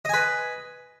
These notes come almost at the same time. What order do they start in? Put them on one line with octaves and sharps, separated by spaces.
D#5 G#5 B4